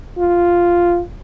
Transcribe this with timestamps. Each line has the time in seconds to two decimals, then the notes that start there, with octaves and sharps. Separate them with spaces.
0.19 F4